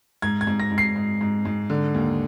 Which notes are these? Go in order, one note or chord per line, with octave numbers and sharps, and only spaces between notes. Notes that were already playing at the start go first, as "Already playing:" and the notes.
G#2 G#6
G#6
G#2
A#6
G#2
C7
G#2
G#2
G#2
D3
D#2